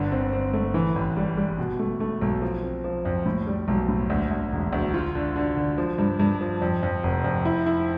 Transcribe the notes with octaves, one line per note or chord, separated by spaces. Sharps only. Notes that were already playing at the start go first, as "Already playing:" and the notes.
Already playing: G1 D3
C4
C4
A3
E3
A1
G3
G3
B2
A3
A3
B1
F3
C4
F3
F2
A2
G3
B1
A2
D2
D2
E1
D2
F4
D3
D3
D3
F3
G2
G2
F3
F2
F2
F1
F2
E4
E4